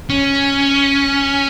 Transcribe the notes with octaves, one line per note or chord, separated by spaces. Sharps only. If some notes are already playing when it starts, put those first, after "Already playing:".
C#4